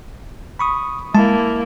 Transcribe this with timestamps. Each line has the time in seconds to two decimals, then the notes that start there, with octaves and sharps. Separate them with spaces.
0.59 B5 C#6 D#6
1.15 G#3 A#3 E4 A5